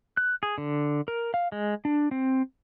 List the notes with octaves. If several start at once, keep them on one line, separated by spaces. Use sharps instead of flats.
F#6
G#4
D3
A#4
F5
G#3
D4
C4